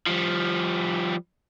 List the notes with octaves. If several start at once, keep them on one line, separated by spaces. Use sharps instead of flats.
F3 G3